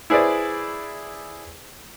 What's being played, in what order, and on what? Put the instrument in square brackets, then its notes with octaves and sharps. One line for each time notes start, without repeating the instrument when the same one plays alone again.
[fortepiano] E4 G#4 B4 C5 D5